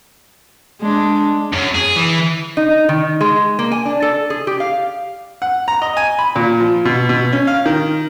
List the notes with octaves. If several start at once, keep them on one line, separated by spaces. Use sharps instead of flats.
G#3 D4
F#2
G#4
E3
D#4
D#3
G#3
A#3
G#5
D4
A4
G#4
G4
F5
F#5
A#5
D#5
G#5
B5
A#2
F3
B2
B2
C#4
F5
D#3